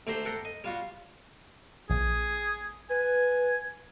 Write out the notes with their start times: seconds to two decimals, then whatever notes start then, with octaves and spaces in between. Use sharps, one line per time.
0.07 D2 A3 G4 C5 A#5 C6
0.25 A4 F#5 G5 A#5
0.45 D#5
0.64 G3 F4 F#4
1.90 A#1 G#4
2.90 B4 G#5